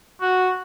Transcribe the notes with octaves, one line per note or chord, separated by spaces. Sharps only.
F#4